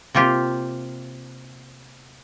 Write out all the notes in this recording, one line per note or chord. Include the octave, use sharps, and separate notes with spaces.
C3 A#3 F4 G4